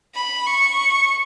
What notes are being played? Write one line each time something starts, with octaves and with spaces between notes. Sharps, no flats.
B5
C#6